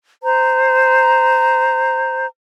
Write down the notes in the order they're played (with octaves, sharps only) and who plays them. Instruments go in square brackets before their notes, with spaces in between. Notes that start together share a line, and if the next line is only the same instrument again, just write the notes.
[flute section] C5 A#5